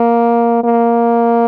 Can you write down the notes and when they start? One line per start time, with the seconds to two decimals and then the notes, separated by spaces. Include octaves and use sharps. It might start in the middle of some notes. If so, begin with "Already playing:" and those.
Already playing: A#3
0.64 A#3